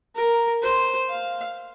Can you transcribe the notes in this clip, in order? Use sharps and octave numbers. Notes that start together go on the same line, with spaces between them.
A#4
C5
F5